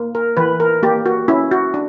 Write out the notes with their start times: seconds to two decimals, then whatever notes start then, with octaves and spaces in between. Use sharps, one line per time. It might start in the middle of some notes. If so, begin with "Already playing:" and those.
Already playing: A#3
0.15 A#4
0.37 E3 B4
0.60 A#4
0.83 A#3 G4
1.06 F#4
1.28 C#4 E4
1.51 F#4
1.74 D4